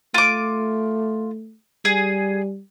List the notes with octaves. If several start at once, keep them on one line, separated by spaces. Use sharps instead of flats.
A3 F4 D6
G3 G#4